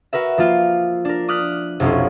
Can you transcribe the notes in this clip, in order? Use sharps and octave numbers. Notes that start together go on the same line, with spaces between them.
F#4 A#4 B4 E5
F3 A#3 F4
D4 A#4
D6 D#6 F6 F#6 B6
F1 B1 F3 C#4 E4 C6